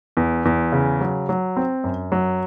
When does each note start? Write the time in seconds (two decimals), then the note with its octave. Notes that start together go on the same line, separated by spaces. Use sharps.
0.17 E2
0.45 E2
0.72 C#3
1.01 F#3
1.29 F#3
1.56 C4
1.84 F#2
2.12 F#3